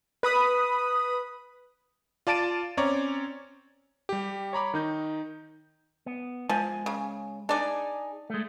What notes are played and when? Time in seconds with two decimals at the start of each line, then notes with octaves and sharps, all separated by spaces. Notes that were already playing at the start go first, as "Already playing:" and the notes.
0.23 B4 B5 D#6
2.27 F4 D5 A5 A6 D7 D#7
2.77 C4 C#4 C#5 D5 A#5
4.09 G3 G4
4.53 C#5 A#5 B5 D6
4.74 D#3 D#4 G6
6.06 B3
6.49 F3 G#3 G#5
6.86 C#3
7.49 D4 D#4 G#4 D5
8.30 G#3 A3